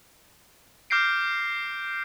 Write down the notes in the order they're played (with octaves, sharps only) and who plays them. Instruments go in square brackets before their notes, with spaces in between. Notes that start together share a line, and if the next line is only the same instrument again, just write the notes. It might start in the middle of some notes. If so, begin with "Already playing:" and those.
[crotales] D6 F6 G6 A#6 C7 D7